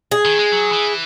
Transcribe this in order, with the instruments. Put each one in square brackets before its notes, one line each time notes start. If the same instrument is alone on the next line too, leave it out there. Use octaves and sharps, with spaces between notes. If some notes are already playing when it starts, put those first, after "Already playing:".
[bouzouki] G#4
[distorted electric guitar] D#3
G#3
F#3
E3